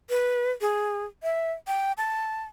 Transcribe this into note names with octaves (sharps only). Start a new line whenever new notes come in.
B4
G#4
E5
G5
A5